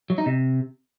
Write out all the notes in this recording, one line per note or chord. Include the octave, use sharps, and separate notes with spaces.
F#3
D#4
C3